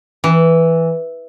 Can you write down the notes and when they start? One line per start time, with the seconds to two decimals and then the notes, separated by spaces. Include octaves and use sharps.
0.24 E3